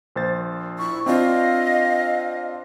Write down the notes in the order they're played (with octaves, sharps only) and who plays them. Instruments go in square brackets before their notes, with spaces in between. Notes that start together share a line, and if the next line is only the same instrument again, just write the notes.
[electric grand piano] A#1 C5 A6
[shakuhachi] E4 [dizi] C#6
[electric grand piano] C4 D4 F4 [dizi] D#5 [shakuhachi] F5